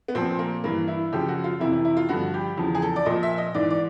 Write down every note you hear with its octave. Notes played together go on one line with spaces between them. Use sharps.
B3
A#2 F3 C4
A#3
G2 E3 A#3
E4
F#2 C#3 F3 G4
F#4
F4
F2 C3 E3 E4
E4
E4
F4
G2 D3 F3 F#4
G4
E2 C#3 F3
G#4
A4
D5
A#2 F3 D#5
E5
D#5
G#2 E3 D5
D5